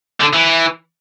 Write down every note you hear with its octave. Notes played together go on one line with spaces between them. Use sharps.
D3
E3